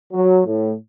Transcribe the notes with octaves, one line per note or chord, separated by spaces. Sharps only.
F#3
A2